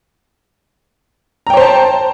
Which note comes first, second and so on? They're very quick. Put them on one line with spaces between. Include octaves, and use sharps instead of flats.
A#5 G5 C#5 C5 A5